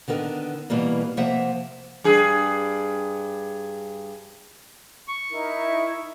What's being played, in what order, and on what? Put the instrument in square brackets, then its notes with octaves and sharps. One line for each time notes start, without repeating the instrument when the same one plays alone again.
[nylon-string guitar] D3 D#3 B3 A#4
B2 E3 G3 A#3
C3 F3 A#3 E5 F#5
[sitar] G2 G#4
[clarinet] C#6
[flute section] D#4 E4 A#4